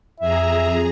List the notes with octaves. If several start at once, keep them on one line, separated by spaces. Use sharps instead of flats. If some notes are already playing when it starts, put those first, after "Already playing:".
F2 G#4 E5 A#5